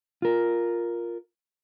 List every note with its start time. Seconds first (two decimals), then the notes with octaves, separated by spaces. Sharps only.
0.22 F4 A#4